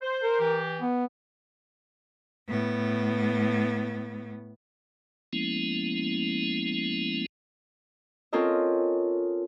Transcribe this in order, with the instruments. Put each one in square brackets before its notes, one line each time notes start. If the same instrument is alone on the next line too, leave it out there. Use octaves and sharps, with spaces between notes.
[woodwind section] C5
[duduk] A#4
[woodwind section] E3 G4
[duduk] B3
[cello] A2 B3
[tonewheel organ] F3 G#3 A#3 B3 C#4 E4
[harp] C4 C#4 F4 A4 A#4 D#5